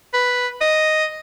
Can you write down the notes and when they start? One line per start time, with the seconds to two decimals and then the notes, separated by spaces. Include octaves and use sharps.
0.14 B4
0.61 D#5